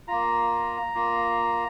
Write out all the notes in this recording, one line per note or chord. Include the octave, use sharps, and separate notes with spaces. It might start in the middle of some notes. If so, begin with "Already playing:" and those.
A#3 F4 A#5
A#3 F4